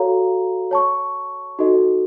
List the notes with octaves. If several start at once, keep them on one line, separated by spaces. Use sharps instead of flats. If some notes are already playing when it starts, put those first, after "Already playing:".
Already playing: F#4 A4 C#5 F5 A#5
C#5 A5 C#6
D#4 F#4 A4 D#5